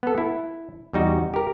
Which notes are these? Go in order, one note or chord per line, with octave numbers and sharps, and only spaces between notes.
B3 A4
E4
E2 G3 D#4 F#4
G4 A#4